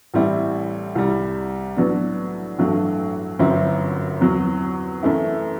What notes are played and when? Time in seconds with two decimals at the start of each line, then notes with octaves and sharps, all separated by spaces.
0.14 A1 A2 G3 C4 E4
0.95 C2 C3 G3
1.77 A2 F#3 B3 D4
2.58 A1 G2 F#3 A3
3.39 G1 F#2 F#3 C4 E4
4.21 E2 C3 F#3
5.03 F#2 E3 A3 E4